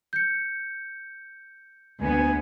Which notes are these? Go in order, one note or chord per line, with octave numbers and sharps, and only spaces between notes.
G6 C#7
D2 B3 G#5